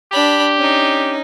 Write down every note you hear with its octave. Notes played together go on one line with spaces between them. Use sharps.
D4 G4 B5
C#4 D#4